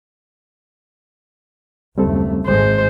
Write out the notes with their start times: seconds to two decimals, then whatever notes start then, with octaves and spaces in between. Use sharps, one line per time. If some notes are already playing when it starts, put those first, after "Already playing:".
1.98 F#1 D#2 G3 A3 C4 A4
2.47 G#1 G#3 C5